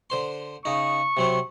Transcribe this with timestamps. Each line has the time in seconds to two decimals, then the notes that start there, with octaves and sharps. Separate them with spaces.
0.10 D3 C5 C6
0.65 C#3 D#4 C#6
1.17 C3 F#3 C4